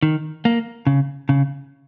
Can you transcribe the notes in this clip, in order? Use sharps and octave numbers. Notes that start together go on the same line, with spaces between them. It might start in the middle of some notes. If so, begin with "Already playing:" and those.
D#3
A#3
C#3
C#3